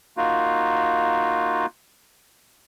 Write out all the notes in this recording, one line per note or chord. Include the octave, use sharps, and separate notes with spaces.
A#3 D#4 F4 F#4